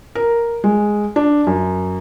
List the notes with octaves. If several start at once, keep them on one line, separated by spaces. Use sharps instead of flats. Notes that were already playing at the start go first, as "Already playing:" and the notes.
A#4
G#3
D4
F#2